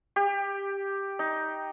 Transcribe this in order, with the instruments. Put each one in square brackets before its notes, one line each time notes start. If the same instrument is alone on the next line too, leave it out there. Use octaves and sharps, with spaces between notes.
[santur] G4
D#4